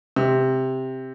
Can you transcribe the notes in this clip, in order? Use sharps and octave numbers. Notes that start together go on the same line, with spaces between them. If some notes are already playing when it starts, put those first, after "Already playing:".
C3